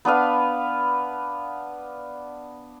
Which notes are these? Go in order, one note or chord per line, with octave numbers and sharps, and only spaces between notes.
B3 D4 B4 F5